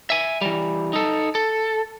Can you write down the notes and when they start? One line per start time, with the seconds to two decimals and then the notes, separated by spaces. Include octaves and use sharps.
0.10 E5 G#5
0.41 E3 G3
0.93 D#4 A4
1.35 A4